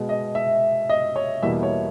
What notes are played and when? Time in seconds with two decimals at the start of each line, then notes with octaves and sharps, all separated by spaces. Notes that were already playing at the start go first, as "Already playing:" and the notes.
Already playing: B2 G#3
0.09 D#5
0.35 E5
0.90 D#5
1.16 C#5
1.42 E2 B2 G3 A#3 E5
1.63 C#5